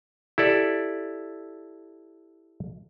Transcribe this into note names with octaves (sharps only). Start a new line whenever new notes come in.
E4 G4 A4 D5